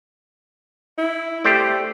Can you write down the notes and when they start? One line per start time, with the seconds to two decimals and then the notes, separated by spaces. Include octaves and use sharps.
0.98 E4
1.44 A3 G4 C5 D5